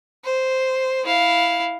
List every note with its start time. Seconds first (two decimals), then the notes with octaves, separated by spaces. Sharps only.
0.25 C5
1.04 E4 F5